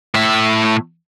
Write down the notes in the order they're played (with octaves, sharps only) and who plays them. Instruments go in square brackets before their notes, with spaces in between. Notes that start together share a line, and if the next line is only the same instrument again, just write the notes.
[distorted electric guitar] A2 E5